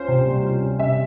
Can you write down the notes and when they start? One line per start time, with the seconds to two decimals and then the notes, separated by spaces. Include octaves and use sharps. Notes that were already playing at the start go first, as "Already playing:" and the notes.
Already playing: C#4 F4 C5
0.08 C3
0.25 G3
0.43 F4
0.62 C#4
0.79 C3 E5